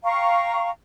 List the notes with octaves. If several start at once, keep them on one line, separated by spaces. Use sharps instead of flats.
F5 G5 A#5 C#6